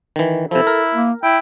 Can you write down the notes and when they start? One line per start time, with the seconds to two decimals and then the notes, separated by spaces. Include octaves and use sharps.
0.16 D#3 E3
0.51 C3 F3 E4 A4
0.67 A#4
0.95 A#3
1.23 E4 G5